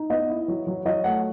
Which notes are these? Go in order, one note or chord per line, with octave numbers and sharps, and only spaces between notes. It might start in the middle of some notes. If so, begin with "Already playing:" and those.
Already playing: D#4
B3 D#5
E4
F#3
F#3
F#3 D#5
A3 F#5